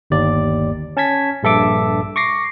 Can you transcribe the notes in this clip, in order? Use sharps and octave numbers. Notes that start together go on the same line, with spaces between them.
G1 D#2 D5
C#4 A5 G#6 B6
A#1 G2 A4 E5 D6
C#6 D6 A#6 C7